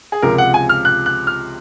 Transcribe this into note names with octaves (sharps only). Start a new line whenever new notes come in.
G#4
C#2 C3 F3 A#4
F#5
G#5
F6
F#6
F#6
F6